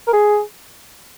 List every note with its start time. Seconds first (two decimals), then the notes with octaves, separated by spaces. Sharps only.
0.07 A#4
0.13 G#4